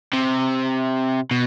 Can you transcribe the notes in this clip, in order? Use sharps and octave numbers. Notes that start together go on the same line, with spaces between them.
C3
B2